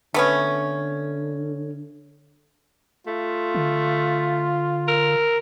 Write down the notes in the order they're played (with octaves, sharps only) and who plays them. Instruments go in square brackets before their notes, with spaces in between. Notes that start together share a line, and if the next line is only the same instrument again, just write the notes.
[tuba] D3 [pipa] A3 B3 C#4
[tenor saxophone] A3 [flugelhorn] F4
[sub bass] D3
[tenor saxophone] A#4